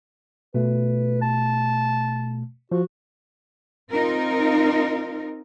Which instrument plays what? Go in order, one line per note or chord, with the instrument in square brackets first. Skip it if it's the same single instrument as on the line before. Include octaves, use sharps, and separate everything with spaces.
[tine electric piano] B2 A3 [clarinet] B4
[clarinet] A5
[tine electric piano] F3 [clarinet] F#4
[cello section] C4 D#4 F4 A#4